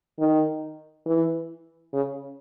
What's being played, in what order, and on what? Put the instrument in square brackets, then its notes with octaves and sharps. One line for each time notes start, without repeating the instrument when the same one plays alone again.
[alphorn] D#3
E3
C#3